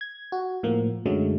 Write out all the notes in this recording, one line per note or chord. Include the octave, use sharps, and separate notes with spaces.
G#6
F#4
A2 F3 A#3
F#2 D3 F#3 G#3 A3